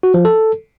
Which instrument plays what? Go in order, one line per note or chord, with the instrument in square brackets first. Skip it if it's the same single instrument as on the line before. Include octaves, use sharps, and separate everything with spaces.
[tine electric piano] F#4
F3
A4